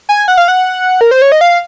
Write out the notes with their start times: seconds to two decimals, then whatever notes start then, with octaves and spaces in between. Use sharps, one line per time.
0.09 G#5
0.28 F#5
0.37 F5
0.48 F#5
1.01 A#4
1.11 C5
1.22 C#5
1.32 D#5
1.41 F5